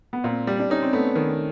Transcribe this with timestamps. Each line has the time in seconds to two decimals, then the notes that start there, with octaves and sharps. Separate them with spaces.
0.13 B3
0.24 A#2 C4
0.47 G3
0.59 D4
0.70 C#4 D#4
0.82 C4
0.93 A3 B3
1.15 D#3